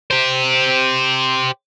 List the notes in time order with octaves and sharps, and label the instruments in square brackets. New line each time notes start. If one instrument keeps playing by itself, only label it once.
[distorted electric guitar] G4 C5